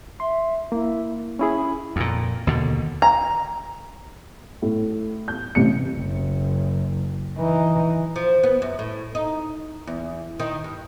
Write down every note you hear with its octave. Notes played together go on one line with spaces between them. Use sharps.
E5 C6
A#3 E4
C#4 E4 G#4 B5
F2 A#2
D#2 B2 D3
A#5
A2
G6
A1 C3 C#7
F#1
E3 D#4
F3
B3
F#2
A2
D#4
E2
D#3
G2